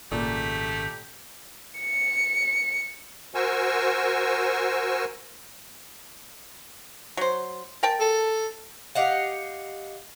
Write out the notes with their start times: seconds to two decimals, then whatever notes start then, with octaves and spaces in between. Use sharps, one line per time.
0.11 G#1 A#2 C#3 A3 G4
1.80 C#7
3.35 F#4 A#4 C5 G#5 C#6 E6
7.17 F#3 C5
7.83 A#4 G5 A5
8.00 A4
8.95 G4 D#5 F5 F#5